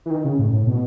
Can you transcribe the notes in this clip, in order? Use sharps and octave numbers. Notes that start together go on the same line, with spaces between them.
E3
D#3
C#3
A2
A2
B2